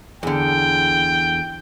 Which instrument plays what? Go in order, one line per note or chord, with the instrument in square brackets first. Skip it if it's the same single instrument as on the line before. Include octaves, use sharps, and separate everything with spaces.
[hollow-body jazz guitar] E2 D3 [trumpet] G5